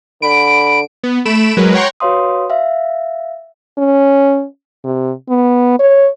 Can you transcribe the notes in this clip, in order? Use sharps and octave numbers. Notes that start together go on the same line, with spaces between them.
D3 B5 D7
B3
A3 B5 D7 E7
F#3 G#3 A#4 B4
C#5 F#5 G5 A#5 C6 C#6
F#4 B4 C#5 F5 C6 D#6
E5 F5
C#4
C3
B3
C#5